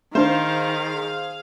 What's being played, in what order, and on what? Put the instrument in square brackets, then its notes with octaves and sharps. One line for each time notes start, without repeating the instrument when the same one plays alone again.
[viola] D#3 [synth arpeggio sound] A3 D4 [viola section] G#4 F5 [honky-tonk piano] C5